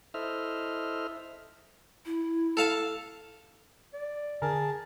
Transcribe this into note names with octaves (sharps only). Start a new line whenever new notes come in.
E4 A4 C5 D#5 E5 F6
E4
A4 F5 A5
D5
D3 G#4 A#4 A5